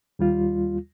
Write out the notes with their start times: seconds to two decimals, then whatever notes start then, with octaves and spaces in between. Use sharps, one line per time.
0.19 D#2 G3 F4